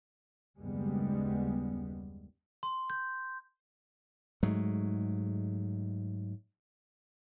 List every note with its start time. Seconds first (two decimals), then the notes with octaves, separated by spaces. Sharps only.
0.60 F#1 D#2 G3 G#3 B3
2.63 C6
2.90 G6
4.43 G#2 F#3 G#3 A3